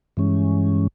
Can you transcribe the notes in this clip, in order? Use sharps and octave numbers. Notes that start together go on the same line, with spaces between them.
G2 E3 G#3 C#4